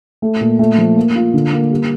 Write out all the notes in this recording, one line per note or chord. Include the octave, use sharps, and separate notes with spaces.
A3
A#2
A3
F3
A#3
F4
D3
A#3
G3